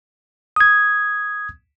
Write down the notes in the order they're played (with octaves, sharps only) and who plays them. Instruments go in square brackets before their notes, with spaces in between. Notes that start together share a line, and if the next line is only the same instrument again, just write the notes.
[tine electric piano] D#6 G#6